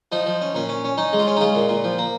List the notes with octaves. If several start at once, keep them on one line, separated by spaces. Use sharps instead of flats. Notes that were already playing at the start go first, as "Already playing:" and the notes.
F3 D#4
F3
C#4
A#2 C#4
C#4
C#4
C#4 D#4
G#3
F4
C#4
D#4
G#3 F4
A#2
A#2
F3
A#3